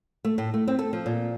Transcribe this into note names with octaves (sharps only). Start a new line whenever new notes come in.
A3
A2
A3
C4
A4
F3
A#2